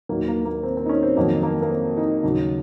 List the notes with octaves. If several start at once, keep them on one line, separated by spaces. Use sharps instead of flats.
D#2 D#3 F#3 A#3
A#3
A#3
C4
C4
D#4
C#4
C4
F2 D#3 F#3 A#3
A#3
A#3
C4
D#4
D#2 C#3 F#3